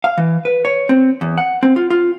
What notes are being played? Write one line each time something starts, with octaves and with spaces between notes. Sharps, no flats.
F5
E3
B4
C#5
C4
E2
F#5
C4
F4
F4